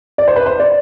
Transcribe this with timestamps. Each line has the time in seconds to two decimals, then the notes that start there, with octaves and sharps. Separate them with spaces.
0.18 D5
0.28 C5
0.36 B4
0.46 C5
0.60 D5